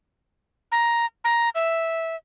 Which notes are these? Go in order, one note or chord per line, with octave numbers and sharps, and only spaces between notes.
A#5
A#5
E5